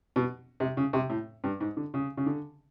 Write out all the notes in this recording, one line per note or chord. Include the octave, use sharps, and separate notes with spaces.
B2
C3
C#3
C3
A2
G2
G#2
D3
C#3
C#3
D3